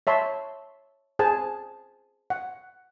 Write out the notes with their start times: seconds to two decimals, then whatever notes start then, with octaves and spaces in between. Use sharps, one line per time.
0.07 C#5 E5 A5 C6
1.19 G#4 C5 G#5 A5
2.30 F#5